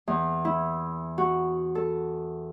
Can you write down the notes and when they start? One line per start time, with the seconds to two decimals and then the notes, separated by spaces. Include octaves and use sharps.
0.08 E2
0.45 E4
1.18 F#4
1.75 A4